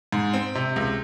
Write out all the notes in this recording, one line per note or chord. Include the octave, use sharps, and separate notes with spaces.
G#2
C4
C3
C#2